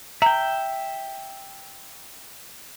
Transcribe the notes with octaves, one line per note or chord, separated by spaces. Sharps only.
E5 G5 A#5